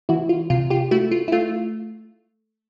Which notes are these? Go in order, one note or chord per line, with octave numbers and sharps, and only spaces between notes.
E3 E4 F#4
F4
C3 F4
F4 G4
A3 E4 F#4
F4
E4
A3 F4